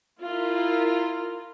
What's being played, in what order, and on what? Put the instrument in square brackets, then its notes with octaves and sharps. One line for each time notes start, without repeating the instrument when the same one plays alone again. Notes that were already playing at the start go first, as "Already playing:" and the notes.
[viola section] E4 F4 A#4